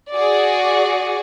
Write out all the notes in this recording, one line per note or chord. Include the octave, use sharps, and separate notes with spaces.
F#4 G#4 D5